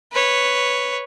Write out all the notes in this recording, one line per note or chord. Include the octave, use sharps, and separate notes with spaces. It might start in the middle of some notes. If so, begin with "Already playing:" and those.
B4 C#5